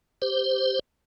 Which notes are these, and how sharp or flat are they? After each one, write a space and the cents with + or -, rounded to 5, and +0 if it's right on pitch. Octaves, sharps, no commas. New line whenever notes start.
G4 +0 C5 -5